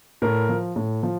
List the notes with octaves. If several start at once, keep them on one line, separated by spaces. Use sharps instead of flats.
A2 A#4
F3
A2
F3